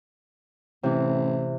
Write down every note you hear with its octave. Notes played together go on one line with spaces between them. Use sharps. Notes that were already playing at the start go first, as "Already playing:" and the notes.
A1 C3 E3